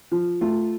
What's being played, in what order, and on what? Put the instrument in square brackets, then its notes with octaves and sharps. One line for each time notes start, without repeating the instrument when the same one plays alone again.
[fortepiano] F3
A3 F4